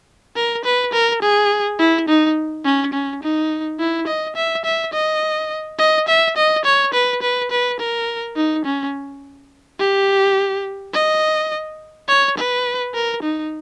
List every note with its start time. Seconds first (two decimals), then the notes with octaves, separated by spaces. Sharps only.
0.36 A#4
0.65 B4
0.93 A#4
1.22 G#4
1.79 E4
2.08 D#4
2.64 C#4
2.93 C#4
3.23 D#4
3.80 E4
4.07 D#5
4.36 E5
4.65 E5
4.93 D#5
5.79 D#5
6.08 E5
6.37 D#5
6.65 C#5
6.93 B4
7.22 B4
7.51 B4
7.79 A#4
8.36 D#4
8.65 C#4
9.79 G4
10.94 D#5
12.08 C#5
12.37 B4
12.94 A#4
13.22 D#4